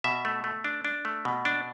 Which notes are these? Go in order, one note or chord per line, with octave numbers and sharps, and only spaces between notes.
B2 E5
A3
A3
D4
D4
A3
B2
D4